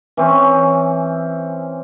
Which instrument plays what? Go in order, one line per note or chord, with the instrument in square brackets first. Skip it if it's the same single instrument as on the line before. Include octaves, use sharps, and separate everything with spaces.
[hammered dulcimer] E3 C4 C#4